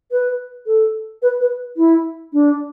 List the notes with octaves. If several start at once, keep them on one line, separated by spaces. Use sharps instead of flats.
B4
A4
B4
B4
E4
D4